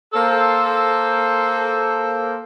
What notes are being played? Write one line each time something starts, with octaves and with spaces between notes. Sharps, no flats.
A#3 A4 C5